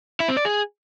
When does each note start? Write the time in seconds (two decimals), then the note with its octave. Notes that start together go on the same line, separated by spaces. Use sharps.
0.20 E4
0.28 C4
0.37 D5
0.45 G#4